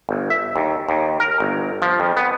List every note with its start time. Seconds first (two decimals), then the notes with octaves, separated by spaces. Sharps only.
0.09 G1
0.30 E5
0.56 D#2
0.89 D#2
1.20 A#4
1.40 G1
1.82 F3
2.00 F2
2.17 B3